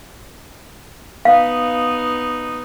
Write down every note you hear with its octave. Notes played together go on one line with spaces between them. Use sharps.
B3 D#4 F5